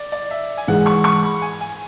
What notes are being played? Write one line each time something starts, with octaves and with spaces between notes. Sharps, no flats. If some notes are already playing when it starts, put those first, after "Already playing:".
Already playing: D5
D5
E5
G#5
G#2 E3 G#3 F#5
C#6
C#6
B5
G#5
G#5